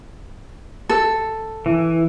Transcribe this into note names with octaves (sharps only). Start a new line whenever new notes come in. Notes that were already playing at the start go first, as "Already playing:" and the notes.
A4
E3